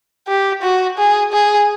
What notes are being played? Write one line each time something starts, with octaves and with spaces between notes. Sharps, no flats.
G4
F#4
G#4
G#4